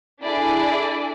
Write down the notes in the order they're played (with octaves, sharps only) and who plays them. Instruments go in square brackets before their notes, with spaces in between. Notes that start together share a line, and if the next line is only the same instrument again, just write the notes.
[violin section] D4 E4 G#4 A4 D5